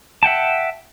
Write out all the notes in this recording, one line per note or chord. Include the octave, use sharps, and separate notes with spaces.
E5 F#5 G5 A5